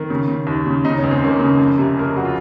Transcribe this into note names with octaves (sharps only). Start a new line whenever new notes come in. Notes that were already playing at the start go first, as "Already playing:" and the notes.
Already playing: D#3 C4
C#3
C#3
D#2
C#3
C#3 D#4
C#4
C#2
C4
C#2 A#3 C#4
C#3
F2
C3
F2 A#4
G#4
F2 F#4
F4